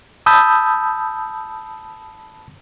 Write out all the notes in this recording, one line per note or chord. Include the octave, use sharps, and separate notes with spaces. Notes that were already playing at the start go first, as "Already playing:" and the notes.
A5 B5 D#6 E6 G6